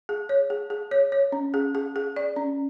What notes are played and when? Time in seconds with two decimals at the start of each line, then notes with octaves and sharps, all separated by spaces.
0.09 G#4
0.29 C#5
0.50 G#4
0.70 G#4
0.91 C#5
1.12 C#5
1.32 C#4
1.54 G#4
1.75 G#4
1.96 G#4
2.16 D5
2.36 C#4